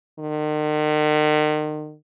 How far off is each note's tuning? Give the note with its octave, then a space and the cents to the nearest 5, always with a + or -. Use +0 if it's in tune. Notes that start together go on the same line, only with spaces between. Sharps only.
D#3 -40